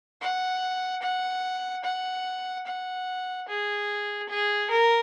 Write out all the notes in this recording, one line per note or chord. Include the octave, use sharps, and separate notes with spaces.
F#5
F#5
F#5
F#5
G#4
G#4
A#4